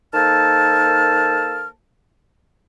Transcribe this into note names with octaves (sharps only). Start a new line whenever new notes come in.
D#3 A#3 A4 C5 A5 F6